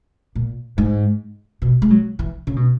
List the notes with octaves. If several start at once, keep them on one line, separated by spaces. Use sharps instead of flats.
A#2
G#2
B2
G#3
F#3
E3
C#3
B2